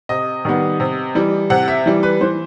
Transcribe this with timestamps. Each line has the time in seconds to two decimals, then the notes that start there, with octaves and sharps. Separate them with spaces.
0.09 C3 D#5
0.45 D#3 G3 B3
0.80 C3
1.15 E3 G3
1.50 C3 F#5
1.68 E5
1.86 E3 G3
2.03 B4
2.21 E3 C5